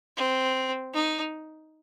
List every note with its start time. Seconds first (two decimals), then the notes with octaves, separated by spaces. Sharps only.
0.17 C4
0.94 D#4